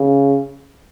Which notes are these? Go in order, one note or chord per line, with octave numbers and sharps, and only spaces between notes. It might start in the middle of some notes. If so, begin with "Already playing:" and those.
Already playing: C#3